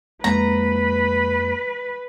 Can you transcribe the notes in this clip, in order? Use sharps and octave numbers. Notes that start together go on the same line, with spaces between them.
F2 G#3 A#3 B4 A#5